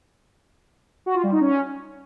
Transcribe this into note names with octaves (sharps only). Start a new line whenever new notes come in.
F#4
F4
G3
D#4
C#4